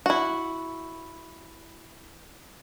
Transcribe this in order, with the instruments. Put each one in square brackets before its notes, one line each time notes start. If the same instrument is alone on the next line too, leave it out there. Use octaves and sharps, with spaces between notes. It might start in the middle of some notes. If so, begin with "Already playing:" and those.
[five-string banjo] E4 F#4